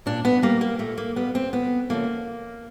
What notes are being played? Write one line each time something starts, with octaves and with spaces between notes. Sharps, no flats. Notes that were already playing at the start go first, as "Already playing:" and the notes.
A#2 D4
B3
G3 A#3
A#3
A#2 A3
A#3
G3 B3
C4
D2 B3
C#3 F3 A3 A#3